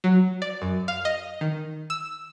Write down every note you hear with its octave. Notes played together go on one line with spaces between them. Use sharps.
F#3
D5
F#2
F5
D#5
D#3
E6